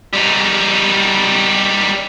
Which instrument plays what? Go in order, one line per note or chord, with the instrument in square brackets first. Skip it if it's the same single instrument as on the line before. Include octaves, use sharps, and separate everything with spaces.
[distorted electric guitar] G3 D#4